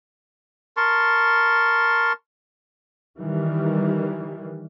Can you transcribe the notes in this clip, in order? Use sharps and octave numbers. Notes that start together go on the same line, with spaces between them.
A#4 A5 C6 C#6
D#3 E3 G3